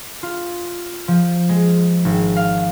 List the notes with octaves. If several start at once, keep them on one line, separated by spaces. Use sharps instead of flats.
F4
F3
G#3
G#1
F5